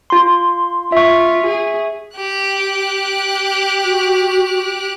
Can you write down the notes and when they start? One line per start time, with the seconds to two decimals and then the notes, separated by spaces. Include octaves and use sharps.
0.10 F4 C6
0.92 F4 E5 C#6
1.46 G#4
2.17 G4 F#6
3.84 F#4